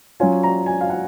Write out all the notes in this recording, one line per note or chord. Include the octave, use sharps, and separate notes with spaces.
F#3 C#4 F4 G#5
A#5
G#5
F5
F#5